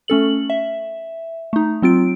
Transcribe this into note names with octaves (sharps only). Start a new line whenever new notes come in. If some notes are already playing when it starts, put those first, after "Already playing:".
A3 C#4 A4 F#7
E5
A3 D#4
F#3 C4 F4 D7